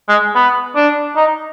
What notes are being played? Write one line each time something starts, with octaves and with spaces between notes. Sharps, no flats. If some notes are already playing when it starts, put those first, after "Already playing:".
G#3
B3
D4
D#4